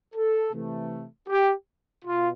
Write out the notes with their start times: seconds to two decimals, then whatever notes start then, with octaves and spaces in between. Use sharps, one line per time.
0.15 A4
0.53 C3 E3 A3
1.28 G4
2.04 B2 F4